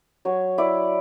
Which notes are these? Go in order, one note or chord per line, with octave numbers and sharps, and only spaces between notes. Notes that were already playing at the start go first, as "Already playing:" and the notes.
F#3 C#5
E4 D5